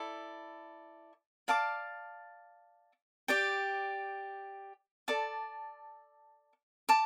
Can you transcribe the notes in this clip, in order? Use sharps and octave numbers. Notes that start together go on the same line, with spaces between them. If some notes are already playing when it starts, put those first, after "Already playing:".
Already playing: E4 A4 D5
D5 F5 A5 D6
G4 D5 G5
A4 D5 A5 D6
A5 D6